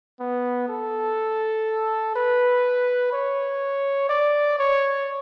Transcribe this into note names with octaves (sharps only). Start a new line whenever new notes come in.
B3
A4
B4
C#5
D5
C#5